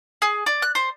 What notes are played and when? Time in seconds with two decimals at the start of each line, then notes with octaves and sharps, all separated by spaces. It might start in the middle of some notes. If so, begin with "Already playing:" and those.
0.22 G#4
0.46 D5
0.62 F#6
0.75 C5